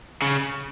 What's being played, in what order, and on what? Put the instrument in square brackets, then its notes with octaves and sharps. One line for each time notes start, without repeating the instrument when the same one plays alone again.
[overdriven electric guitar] C#3